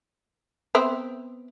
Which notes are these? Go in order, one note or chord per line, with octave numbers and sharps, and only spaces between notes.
B3 C4 E5